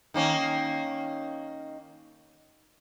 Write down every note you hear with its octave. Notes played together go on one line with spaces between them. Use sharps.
D#3 A#3 C#4